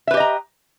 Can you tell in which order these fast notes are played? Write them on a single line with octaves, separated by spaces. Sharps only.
E5 B4 G4 D#5 A#5